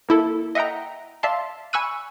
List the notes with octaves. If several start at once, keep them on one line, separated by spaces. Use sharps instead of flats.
A#3 E4 A4
D#5 E5 F#5 G5 A#5
D5 E5 F5 A5 C6
G#5 B5 C#6 E6 F#6 D#7